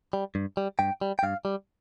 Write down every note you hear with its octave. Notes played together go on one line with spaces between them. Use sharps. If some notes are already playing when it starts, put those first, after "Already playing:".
G3
G2
G3
G2 G5
G3
G5
G2 F5
G3